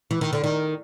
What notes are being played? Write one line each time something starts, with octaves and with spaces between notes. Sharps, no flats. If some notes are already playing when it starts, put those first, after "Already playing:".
E3
D#3
D3
D#3